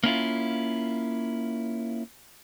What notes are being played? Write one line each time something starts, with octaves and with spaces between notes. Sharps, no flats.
A#3 C#4 E4 F4